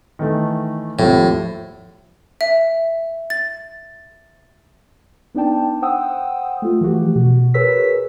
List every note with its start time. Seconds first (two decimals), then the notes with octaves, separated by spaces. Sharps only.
0.19 D#3 E3 A3
0.99 G#1 D#2 A2 F3
2.41 E5
3.30 A6
5.35 B3 D4 D#4 D5 G5 A5
5.82 C5 F#5 G5 D#6 E6
6.62 A3 F4
6.81 E3 F3 A3 F#4 G4
7.15 B2 F#4
7.54 G#4 A#4 B4 C#5 E6 B6